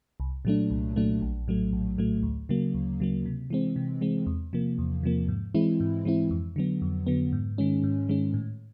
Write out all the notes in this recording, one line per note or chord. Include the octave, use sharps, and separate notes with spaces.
C2
A#2 F#3 A3 D4
C2
A#2 F#3 A3 D4
A#1
A2 F#3 A3
A#1
A2 F#3 A3
D2
C#3 F#3 A#3
D2
C#3 F#3 A#3
C3
E3 G#3 C4
C3
E3 G#3 C4
E2
C3 F3 A#3
E2
C3 F3 A#3
G#2
E3 G#3 C4 E4
G#2
E3 G#3 C4 E4
F2
D3 F#3 B3
F2
D3 F#3 B3
G#2
D#3 G#3 C#4
G#2
D#3 G#3 C#4
A2